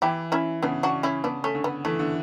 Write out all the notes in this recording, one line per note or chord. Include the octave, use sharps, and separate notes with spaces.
E3 E4 G4
C#4 E4
C#3 B3 D4
D4 F#4
C#4 E4
C#3 B3 D4
A3 C#4
D3
B3
E3 A3
D3